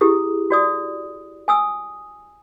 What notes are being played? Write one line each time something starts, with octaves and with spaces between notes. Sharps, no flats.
E4 G4 G#4 D#6
F#4 D5 D#6
G#5 D#6 E6